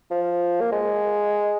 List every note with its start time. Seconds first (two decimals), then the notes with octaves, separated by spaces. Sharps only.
0.11 F3
0.61 A#3
0.72 G#3